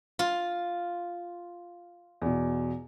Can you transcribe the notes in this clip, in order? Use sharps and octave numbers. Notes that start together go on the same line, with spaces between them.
F4
E2 B2